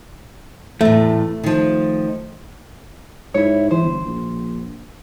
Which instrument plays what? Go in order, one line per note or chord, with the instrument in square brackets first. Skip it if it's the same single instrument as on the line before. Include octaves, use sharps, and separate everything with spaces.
[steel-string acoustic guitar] E2 A2 [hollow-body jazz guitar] A3
[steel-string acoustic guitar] D#3 F3
[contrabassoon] G#2 [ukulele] E4 C#5
[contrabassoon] E3 [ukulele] C5
[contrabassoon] G1
A#1